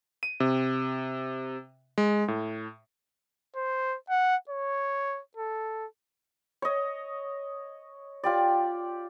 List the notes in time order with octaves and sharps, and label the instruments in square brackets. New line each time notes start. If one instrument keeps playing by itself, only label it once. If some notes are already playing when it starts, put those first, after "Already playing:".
[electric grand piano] D#7
C3
G#3
A2
[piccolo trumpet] C5
F#5
C#5
A4
[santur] C#5 D#5
F4 G4 D5